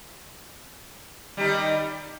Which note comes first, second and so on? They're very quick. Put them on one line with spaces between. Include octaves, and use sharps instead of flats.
G3 D#4 D#3